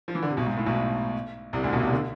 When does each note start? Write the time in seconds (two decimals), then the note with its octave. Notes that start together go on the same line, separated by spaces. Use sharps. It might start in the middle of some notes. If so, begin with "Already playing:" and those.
0.08 F3
0.15 E3
0.23 D3
0.30 C3
0.37 B1 B2
0.46 G#2
0.57 A2
0.66 B1 B2
1.53 C2 C3
1.63 D2 D3
1.73 B1 B2
1.83 C2 C3
1.93 D3